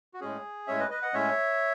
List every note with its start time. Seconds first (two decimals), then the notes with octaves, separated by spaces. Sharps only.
0.14 F#4
0.21 A2 G#3 C#4 G#4
0.67 A2 G#3 C#4 C#5 E5
0.79 B4 D#5
0.91 B4 D#5
1.02 D#5 F#5
1.14 A2 G#3 C#4 C#5 E5